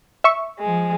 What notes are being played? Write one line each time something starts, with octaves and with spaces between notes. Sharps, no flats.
E5 C#6
F3 G#3